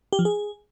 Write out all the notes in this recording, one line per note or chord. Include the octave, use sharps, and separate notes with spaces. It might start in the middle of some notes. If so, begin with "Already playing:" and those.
G4
F3
G#4